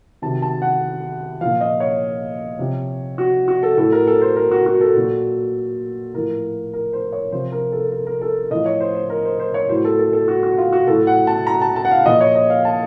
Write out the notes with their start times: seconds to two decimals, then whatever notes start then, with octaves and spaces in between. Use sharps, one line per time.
0.22 C3 D#3 F#3 A5
0.42 A5
0.62 F#5
1.41 A#2 F3 F5
1.61 D#5
1.80 C#5
2.59 C3 F3
3.18 F#4
3.48 F#4
3.63 A4
3.77 A2 F#3 A4
3.92 A#4
4.07 A4
4.22 C5
4.36 A#4
4.51 F#4
4.66 F#4
4.81 A4
4.96 A#2 F#3
6.14 A2 F3 A#4
6.73 A#4
6.93 C5
7.12 C#5
7.32 C3 F3 C5
7.52 A#4
7.72 A4
7.92 A#4
8.07 A#4
8.21 A4
8.51 A2 F3 D#5
8.66 C#5
8.81 C5
8.95 C5
9.10 A#4
9.25 C5
9.40 C5
9.54 C#5
9.69 A2 F#3 C5
9.85 A4
9.99 A4
10.13 A4
10.28 F#4
10.43 F#4
10.58 F4
10.73 F#4
10.87 A2 F#3 A4
11.07 F#5
11.27 A5
11.47 A#5
11.61 A5
11.76 A5
11.85 F#5
11.91 F5
12.06 A#2 F3 D#5
12.21 C#5
12.35 D#5
12.50 F5
12.65 A5